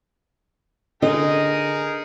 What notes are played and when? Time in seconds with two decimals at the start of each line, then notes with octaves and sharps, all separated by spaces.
1.02 D3 D#4 G#4 A#4 D#5